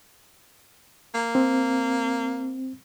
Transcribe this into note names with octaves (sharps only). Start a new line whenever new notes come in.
A#3
C4